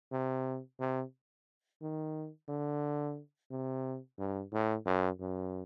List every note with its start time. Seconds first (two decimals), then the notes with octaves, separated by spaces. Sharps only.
0.12 C3
0.80 C3
1.82 D#3
2.49 D3
3.51 C3
4.19 G2
4.53 A2
4.86 F#2
5.20 F#2